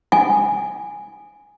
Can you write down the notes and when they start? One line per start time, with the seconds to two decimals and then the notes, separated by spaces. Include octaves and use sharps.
0.12 G#5